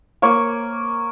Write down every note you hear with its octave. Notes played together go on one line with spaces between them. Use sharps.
A#3 C#5